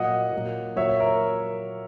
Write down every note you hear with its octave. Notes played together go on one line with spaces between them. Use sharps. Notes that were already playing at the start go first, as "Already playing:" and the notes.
Already playing: A#2 F#3 D#5 F#5
A#2 F#3
A#2 F#3 C#5 E5
A#4